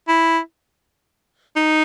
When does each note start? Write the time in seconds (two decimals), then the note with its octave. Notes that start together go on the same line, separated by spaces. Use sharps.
0.08 E4
1.56 D#4